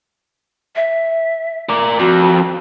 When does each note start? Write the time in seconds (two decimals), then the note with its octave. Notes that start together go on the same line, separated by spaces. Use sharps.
0.76 E5
1.69 A#4 D5
1.99 F2 F#4